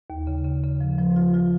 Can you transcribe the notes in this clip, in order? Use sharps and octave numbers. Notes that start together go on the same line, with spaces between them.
D#2
C#3
C#3
C#3
F3
F3
F4
F4